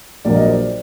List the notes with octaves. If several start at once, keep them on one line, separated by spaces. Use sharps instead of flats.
A#1 A#2 F#3 A#3 D5
D#5
C5 D5